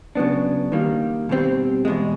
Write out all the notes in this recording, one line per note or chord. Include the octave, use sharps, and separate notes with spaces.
C#3 F#3 B3 D4
D#3 G3 A#3
B2 G3 C4
E2 B2 G#3